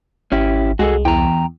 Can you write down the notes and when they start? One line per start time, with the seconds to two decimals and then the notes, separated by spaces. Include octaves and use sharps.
0.32 G#1 C#4 E4 G4
0.79 C2 G#3 F#4 G#4 A4
1.05 E2 G5 A#5